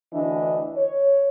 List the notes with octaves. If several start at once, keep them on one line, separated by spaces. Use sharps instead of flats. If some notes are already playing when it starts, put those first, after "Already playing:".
D2 E3 D4 D#5
C#5